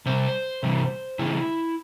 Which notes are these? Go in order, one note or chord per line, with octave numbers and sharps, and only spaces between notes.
C3 G3 C5
C3 E3 G3
C#3 E3 G#3 E4